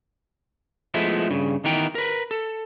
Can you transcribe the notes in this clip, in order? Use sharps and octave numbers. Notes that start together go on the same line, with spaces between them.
F3 G#3 A3 B3 E4
G2 C#3
D#3 E3 B3 A#4 G5
A#4 B4
A4